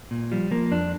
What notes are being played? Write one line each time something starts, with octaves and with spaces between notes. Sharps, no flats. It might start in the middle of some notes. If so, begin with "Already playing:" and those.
A#2
F3 G3
F3 A#3
F2 D4